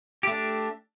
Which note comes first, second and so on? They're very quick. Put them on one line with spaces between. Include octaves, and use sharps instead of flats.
G4 A3 D4